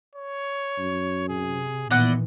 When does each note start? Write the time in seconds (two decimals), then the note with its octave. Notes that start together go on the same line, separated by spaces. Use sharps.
0.15 C#5
0.78 F#2
1.29 C3 G#4
1.90 A#2 D#3 E3 B3 E4 D5 D#5 F#5